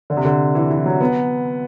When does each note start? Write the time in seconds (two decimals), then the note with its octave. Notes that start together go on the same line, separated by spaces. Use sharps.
0.10 D3
0.17 C3
0.25 D3
0.55 E3
0.70 E3
0.86 F#3
1.01 B3